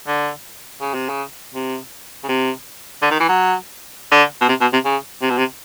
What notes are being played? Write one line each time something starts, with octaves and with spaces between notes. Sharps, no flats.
D3
C#3
C3
C#3
C3
C#3
C3
D3
D#3
E3
F#3
D3
B2
C3
B2
C3
C#3
C3
B2
C3